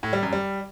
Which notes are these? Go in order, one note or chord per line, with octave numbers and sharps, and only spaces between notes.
A2
G3
F#2
G3